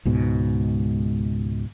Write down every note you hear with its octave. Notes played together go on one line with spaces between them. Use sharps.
C#2 G#2 B2